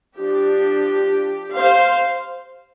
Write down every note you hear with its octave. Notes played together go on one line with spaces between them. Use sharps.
F3 D4 G4
C5 F5